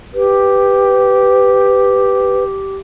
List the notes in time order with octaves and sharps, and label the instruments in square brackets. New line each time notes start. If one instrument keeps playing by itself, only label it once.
[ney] G4 [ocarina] B4